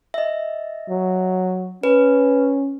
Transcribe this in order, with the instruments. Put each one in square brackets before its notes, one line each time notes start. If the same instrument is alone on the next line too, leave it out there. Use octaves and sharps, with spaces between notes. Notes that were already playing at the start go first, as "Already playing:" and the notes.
[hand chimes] D#5 E5
[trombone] F#3
[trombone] C#4 [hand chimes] B4